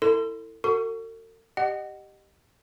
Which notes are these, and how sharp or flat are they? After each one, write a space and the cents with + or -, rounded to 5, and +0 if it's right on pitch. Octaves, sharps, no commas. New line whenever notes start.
E4 +0 A4 +35 C6 -20
F#4 +0 A4 +45 C#6 +20
G4 +0 D#5 -25 F#5 +25